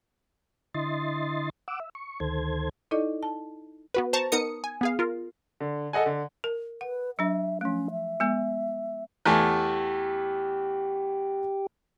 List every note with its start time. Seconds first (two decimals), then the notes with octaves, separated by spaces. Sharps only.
0.75 D3 E4 D#5 C6 A6
1.68 F#5 D6 E6
1.80 E5
1.95 C#6
2.20 D2 D#3 A4 C5 G#6
2.91 D#4 E4 A4 D5 D#5
3.23 A5
3.94 B3 F#4 B4
4.13 C5 A5 A#5 C#6
4.32 B3 D#4 A#4 D#6 C#7
4.64 G#5
4.81 B3 G#4 F5
4.99 F4 A#4
5.60 D3
5.93 A4 D#5 F#5 G#5
6.06 D3
6.44 A#4
6.81 B4 F#5
7.19 F#3 D4 E5
7.61 F3 A3 C#4
7.91 E5
8.20 G#3 B3
9.26 E2 A3 G4 G#5